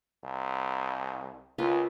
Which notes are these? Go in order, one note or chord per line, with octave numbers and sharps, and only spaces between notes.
C2
C#2 F4 A#4 B4